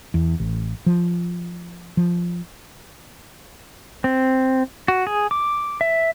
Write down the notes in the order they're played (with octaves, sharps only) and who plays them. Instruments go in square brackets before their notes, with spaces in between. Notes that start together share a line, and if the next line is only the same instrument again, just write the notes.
[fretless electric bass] E2
A1
F3
F3
[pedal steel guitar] C4
F#4
G#4
D6
E5